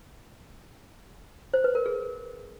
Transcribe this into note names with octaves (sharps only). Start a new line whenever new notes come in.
C5
B4
A#4
G#4